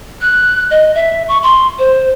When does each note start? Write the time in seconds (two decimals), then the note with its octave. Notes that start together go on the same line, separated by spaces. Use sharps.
0.21 F#6
0.71 D#5
0.95 E5
1.28 C#6
1.43 C6
1.79 C5